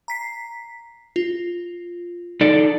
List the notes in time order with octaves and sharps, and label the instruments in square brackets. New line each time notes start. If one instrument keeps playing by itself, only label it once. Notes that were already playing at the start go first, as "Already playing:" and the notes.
[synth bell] A#5 B6 C7
F4
[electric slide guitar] D#4 A4 D5